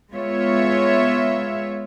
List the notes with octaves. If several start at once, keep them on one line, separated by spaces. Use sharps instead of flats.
G#3 B3 F4 C#5 E5